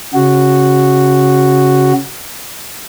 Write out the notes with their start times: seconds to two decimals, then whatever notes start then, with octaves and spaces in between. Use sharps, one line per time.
0.14 C#3 F#4